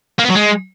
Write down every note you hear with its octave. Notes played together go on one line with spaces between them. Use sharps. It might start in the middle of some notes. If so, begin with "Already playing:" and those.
A#3
B3
F#3
G#3